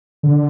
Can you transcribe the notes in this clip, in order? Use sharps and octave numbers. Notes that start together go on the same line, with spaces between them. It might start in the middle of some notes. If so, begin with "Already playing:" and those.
D3